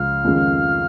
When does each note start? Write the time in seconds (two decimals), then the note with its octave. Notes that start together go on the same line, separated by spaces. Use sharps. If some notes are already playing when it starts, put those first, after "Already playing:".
Already playing: C#2 C#3 F3 F5
0.24 F2 D#3 G#3 C#4